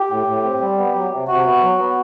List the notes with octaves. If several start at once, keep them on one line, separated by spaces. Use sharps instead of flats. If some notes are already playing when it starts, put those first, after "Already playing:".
Already playing: G4
A2
A2
C4
G3
B3
F#3
C3
C3 F#4
B3
F#3
B3